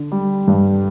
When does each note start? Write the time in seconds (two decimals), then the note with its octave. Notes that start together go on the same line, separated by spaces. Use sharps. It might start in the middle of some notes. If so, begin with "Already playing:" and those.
Already playing: D3
0.12 G3
0.48 G2